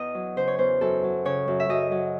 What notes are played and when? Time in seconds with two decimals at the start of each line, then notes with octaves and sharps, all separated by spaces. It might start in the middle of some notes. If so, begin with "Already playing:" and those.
Already playing: E2 D#5
0.14 F#3
0.36 C#3 C5
0.48 C#5
0.58 E2 C5
0.81 F#2 A4
1.04 F#3
1.25 C#3 C#5
1.48 F#2
1.60 E5
1.69 F#2 D#5
1.92 F#3